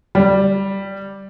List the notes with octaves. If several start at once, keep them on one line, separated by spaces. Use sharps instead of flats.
G3